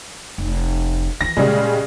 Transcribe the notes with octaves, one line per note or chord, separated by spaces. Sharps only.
F1
D#3 E3 A#6
A#2 C#3 G3 G#3